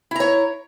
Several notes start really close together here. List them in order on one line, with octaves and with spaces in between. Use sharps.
E4 A#5 C#5